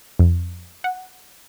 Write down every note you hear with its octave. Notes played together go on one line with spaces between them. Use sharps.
F2
F#5